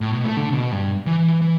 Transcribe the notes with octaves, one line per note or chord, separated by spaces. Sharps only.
A2
B2
A3
D3
C#3
B2
G2
E3
E3